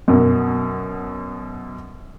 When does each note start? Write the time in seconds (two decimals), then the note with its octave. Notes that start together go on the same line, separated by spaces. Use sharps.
0.08 F#2 B2